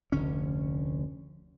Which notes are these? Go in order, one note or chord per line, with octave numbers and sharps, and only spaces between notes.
F1 D2 D3 C#4